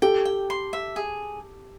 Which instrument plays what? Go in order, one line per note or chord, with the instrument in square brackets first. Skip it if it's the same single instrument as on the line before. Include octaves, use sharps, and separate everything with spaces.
[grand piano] G4 A4 [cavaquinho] G5
[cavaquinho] G5
C6
E5
G#4